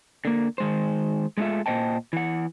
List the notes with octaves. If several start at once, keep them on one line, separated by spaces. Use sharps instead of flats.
D3 A#3
D#3 G#3 C5
G#3 A3 D4 F4 E5
A#2 E3 C5 D#5 G5 A5
E3 F#5